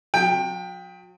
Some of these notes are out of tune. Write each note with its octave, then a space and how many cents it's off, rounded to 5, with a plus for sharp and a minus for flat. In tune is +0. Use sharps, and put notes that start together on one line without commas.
F#3 -45 G5 +15